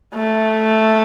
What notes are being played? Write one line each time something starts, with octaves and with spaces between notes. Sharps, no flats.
A3